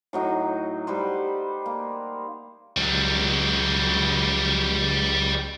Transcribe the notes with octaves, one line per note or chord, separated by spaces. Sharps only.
A2 F#3 D#4
G3 G4 B4 C5
A#3
C#2 F#3 G3